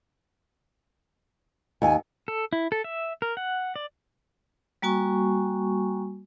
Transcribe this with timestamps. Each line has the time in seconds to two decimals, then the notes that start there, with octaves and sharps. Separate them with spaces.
1.82 D#2 G#5
2.28 A4
2.53 E4
2.72 A4
2.84 E5
3.22 A#4
3.37 F#5
3.76 D5
4.82 G3 A#3 F#4 G#5 C#6